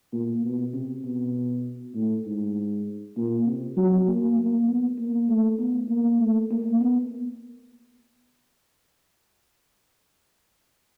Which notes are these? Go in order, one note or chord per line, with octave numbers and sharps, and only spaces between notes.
A#2
B2
C3
B2
A2
G#2
A#2
C3
F#3
A#3
A#3
B3
A#3
A3
B3
A#3
A3
A#3
B3